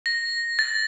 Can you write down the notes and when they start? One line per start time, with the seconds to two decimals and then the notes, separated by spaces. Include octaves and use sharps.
0.06 A#6
0.59 A6